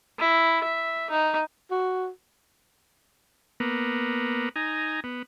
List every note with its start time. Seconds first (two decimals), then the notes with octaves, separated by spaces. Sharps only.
0.19 E4
0.64 E5
1.10 D#4
1.71 F#4
3.60 A#3 B3
4.56 D#4 G#5 A#5
5.04 B3